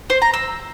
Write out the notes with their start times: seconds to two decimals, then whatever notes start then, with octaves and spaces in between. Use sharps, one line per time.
0.10 C5
0.22 A#5
0.34 E6